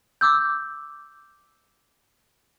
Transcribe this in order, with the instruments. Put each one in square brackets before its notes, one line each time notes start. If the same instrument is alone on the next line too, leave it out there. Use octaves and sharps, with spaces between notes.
[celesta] D6 E6 G6